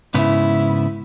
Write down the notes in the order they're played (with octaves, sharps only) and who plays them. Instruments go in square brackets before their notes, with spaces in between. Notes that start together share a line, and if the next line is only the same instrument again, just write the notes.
[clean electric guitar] G#2 C#3 B3 [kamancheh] E4